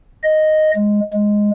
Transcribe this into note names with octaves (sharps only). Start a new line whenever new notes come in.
D#5
G#3
G#3